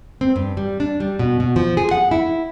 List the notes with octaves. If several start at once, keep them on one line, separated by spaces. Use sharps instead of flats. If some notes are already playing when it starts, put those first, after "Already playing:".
C4
G2
G3
D4
G3
B2
B2
F3
G#4
F#5
E4